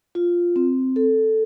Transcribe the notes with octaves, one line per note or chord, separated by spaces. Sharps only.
F4
C4
A4